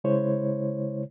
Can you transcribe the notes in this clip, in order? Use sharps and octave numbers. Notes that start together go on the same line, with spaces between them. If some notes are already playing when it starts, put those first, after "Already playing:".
C#3 G#3 E4 C5 C#5